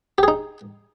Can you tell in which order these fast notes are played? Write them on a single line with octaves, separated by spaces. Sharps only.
G4 G#4 D#4